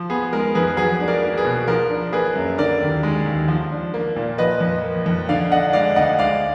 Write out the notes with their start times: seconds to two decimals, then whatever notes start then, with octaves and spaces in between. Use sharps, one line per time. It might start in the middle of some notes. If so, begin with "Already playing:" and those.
Already playing: F3
0.10 B3 G#4
0.33 G#3 A#4
0.55 F2 G#4 B4
0.77 F#3 G#4 B4
1.00 D4
1.08 A#4 D5
1.22 A#3
1.37 G#4 B4
1.45 B2
1.67 F3 A#4
1.90 D4
2.12 A#3 G#4 B4
2.36 F#2
2.58 D3 A#4 D5
2.81 D#2
3.03 G#3
3.26 D#2
3.48 F3
3.71 D4
3.94 A#3
4.16 A#2
4.38 F3 B4 D#5
4.61 F2
4.84 A#3
5.06 F2
5.29 D3 D5 F5
5.51 D4 D#5 F#5
5.73 G#3 D5 F5
5.96 D2 D#5 F#5
6.19 G#3 D5 F5